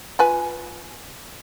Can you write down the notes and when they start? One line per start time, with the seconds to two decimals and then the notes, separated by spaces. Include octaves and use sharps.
0.19 F4 B4 G#5